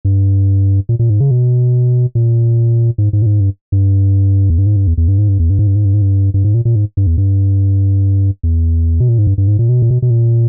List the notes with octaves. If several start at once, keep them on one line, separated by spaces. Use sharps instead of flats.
G2
A#2
A#2
G#2
C#3
B2
A#2
G#2
G#2
A#2
G#2
G2
G2
E2
G2
G#2
G2
E2
E2
G2
G#2
G2
E2
G2
G#2
G2
G#2
G2
G#2
G2
G2
G#2
A#2
A#2
G#2
G2
E2
G2
E2
B2
A#2
G#2
G2
G2
G#2
A#2
B2
A#2
B2
B2
A#2